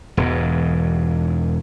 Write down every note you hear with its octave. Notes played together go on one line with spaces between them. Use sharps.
E1 E2 G#2